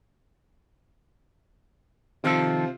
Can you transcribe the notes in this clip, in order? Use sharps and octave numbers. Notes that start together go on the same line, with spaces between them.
C3 D#3 F3 C4 F4 A4